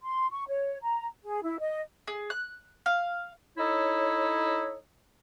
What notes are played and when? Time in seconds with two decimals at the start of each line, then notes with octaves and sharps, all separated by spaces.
0.02 C6
0.31 C#6
0.48 C#5
0.82 A#5
1.23 G#4
1.43 E4
1.60 D#5
2.08 G#4
2.30 F#6
2.86 F5
3.58 D#4 E4 A4 C#5